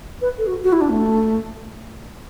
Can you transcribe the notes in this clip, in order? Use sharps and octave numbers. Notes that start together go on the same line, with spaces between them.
B4
A4
F#4
F#4
E4
D4
A3